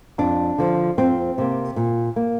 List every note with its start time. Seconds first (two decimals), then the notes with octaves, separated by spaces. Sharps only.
0.18 F2 D4
0.58 D3 F3
0.98 F2 C4
1.38 C3 A#3
1.76 A#2
2.16 A#3